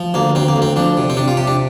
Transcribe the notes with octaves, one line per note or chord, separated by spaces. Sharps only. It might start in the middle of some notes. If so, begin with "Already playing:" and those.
Already playing: F3
D2 A#3
D2 C4
A#3
D2
C4
F3 D4
C3
C4
C3 D4
F4
C3 G4
D4